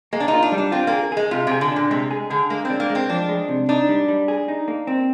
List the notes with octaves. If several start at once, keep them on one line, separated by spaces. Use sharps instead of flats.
G#3 A#3
D4
D#4
F4
D4
G3
D4
C4 F4
A#3
G#4
G#3 G#4
C3 F4
C3 G#4
D3
A#2 D4
C3 G#3
G#4
D3 G#4
G#3 A#3
C4
D4
A#3
G#3
C4
F3 D4
G#3
C3
D4 D#4
G3
G3
G#4
D#4
A#3
C4